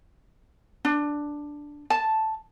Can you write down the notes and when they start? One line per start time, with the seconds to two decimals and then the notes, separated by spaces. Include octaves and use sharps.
0.85 D4
1.90 A5